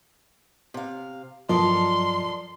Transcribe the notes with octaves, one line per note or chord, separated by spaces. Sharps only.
C3 F5
G2 F3 F#3 A4 A#4 D5 D#5 C6